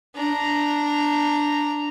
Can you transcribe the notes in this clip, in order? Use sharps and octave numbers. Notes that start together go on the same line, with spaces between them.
D4 A#5